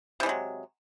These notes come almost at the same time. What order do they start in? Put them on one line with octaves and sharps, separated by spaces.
C3 E3 G#3 F#3